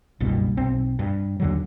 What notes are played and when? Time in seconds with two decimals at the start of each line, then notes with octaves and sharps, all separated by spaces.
0.20 F#1 C2 G2 B2
0.57 B1 C4
0.99 G2
1.40 D#2 D3 F#3